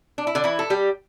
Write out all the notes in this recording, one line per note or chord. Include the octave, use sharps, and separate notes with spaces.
D4
E4
D3 D4
E3 E4
A4
G3 G4